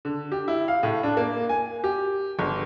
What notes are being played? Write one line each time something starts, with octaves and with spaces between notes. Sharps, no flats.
D3
G4
E4
F5
A2
D4
A#3
G#5
G4
G1